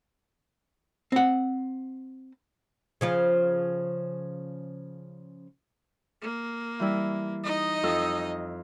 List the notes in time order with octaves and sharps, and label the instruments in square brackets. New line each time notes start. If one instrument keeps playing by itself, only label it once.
[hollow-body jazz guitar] C4 F#5
[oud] C#3 F3 F4
[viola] A#3
[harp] E3 G3 E4
[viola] D#4 D#5
[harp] F2 A4 E6